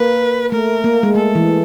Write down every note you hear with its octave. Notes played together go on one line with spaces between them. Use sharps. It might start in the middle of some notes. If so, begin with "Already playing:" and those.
Already playing: A#3 B4
A3 A#4
A#3
G#3
A3 A4
E3